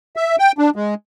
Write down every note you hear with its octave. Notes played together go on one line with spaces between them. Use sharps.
E5
G5
D4
G#3